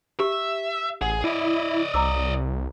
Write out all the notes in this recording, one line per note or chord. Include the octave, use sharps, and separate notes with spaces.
G4 E5
A1 G#4 F#5
E4 D5 D#5
C2 A#5 D6 E6